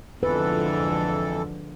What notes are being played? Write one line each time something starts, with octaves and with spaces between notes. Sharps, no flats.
F2 G#2 D3 E3 F3 A4 B4